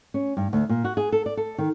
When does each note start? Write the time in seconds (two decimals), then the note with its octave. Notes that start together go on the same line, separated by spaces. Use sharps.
0.14 C#4
0.37 G2
0.53 D2
0.69 A#2
0.84 F#4
0.97 G#4
1.12 A4
1.26 D5
1.37 A4
1.58 D#3